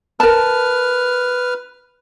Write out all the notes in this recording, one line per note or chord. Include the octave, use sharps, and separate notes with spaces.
A#4 B4 A5 F6